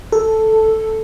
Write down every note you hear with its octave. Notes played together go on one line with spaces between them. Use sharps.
A4